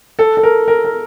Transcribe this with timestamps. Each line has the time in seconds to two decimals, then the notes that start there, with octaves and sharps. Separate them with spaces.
0.19 A4
0.37 A4
0.43 A#4
0.68 A#4
0.84 A#4